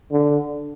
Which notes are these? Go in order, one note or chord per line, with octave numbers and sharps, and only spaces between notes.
D3